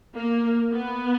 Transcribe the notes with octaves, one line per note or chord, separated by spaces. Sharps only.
A#3
B3